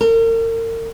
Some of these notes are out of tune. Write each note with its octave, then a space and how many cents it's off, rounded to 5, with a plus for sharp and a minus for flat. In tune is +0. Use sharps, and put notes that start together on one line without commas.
A#4 -40